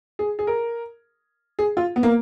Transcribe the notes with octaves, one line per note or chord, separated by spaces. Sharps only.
G#4
G#4
A#4
G#4
F4
B3
A#3